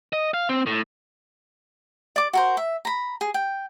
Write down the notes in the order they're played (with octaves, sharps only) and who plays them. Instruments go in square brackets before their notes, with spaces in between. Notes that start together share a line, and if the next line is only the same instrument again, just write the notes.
[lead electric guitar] D#5
F5
C4
A2
[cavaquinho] D5 D6
F#4 A#4 C5
E5
A#5 B5
G#4
G5